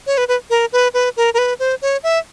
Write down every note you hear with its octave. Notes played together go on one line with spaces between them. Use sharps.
C#5
B4
B4
A#4
B4
B4
A#4
A#4
B4
C5
C#5
E5